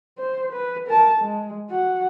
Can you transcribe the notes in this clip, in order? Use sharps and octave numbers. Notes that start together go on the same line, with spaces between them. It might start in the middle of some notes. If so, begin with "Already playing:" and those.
C5
B4
A#4 A5
G#3
F#4 F#5